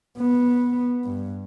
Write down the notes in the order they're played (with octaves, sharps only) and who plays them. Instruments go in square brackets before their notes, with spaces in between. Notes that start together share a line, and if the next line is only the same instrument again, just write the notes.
[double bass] B3
G2